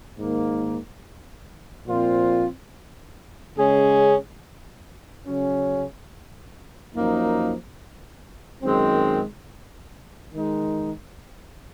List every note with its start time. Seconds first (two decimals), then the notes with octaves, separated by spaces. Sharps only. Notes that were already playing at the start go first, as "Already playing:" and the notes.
0.18 G#2 D#3 A#3
1.87 A#2 F3 C4 F4
3.56 C#3 G#3 C#4 G#4
5.26 C#3 F#3 C#4
6.94 F#2 F3 A#3 D#4
8.63 F#2 D#3 G#3 C4
10.33 D#3 G#3 D#4